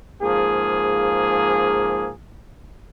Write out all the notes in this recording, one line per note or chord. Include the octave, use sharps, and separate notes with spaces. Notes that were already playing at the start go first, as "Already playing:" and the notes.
G#2 F3 A#3 G#4